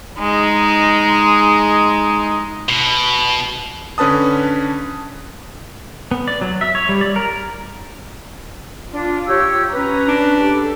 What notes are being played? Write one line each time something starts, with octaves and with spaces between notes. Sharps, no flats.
G#3 D#4
B2
D3 C#4 B4 A5 D#6
B3
D5
F#3
E5
C#5
G3
D5
A#4
D4 F4
G4 C#5 E6
C#4 B4 A#5
D4
G4 A4